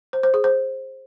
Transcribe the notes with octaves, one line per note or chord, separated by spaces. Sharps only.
C5
C5
G#4
C5